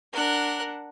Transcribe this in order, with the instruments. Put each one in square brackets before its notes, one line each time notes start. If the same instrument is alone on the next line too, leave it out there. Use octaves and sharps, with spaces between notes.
[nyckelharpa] D4 F#5 [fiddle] A#4 F#6